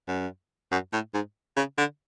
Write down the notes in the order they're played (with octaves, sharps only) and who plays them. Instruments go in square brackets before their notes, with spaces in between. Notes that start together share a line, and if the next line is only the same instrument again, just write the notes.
[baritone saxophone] F#2
F#2
A2
G#2
C#3
D3